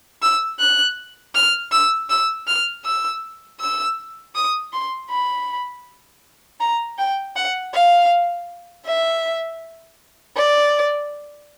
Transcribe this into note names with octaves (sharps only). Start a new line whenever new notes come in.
E6
F#6
F6
E6
E6
F6
E6
E6
D#6
C6
B5
A#5
G5
F#5
F5
E5
D5